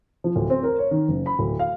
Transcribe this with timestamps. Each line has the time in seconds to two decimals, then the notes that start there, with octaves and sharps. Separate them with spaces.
0.24 F3
0.36 D1
0.50 C4
0.63 A#4
0.79 C#5
0.91 D#3
1.08 F#1
1.26 B5
1.39 D1
1.59 F5